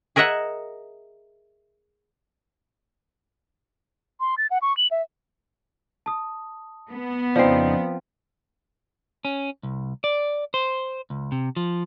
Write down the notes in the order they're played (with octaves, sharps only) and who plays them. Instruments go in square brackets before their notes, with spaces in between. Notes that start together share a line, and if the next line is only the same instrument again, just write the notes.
[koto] G#4 A#4 D#5 E5 F#5
[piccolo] C6
A6
F#5
C#6
F#7
E5
[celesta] A5 D#6
[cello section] B3
[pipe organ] F2 C#3 D#4 [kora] F3 C4 [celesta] D5 C7
[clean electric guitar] C#4
C2
D5
C5
C#2
C3
F3